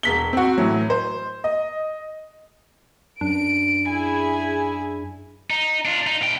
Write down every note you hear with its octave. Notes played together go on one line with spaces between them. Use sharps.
E1 B6 G7
C4 F#4
A2 E3 F#3
C5
D#5
F#2 D4 D7
E4 G#4 G#5
D#4
D4 F4
D#4
B2 G5